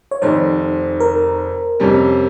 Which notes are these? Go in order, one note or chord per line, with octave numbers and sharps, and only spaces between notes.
C#5
F1 F2 D#3 C5
A#4
F2 C3 G3 C#4